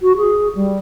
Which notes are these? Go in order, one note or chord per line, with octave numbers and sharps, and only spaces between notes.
F#4
G#4
G3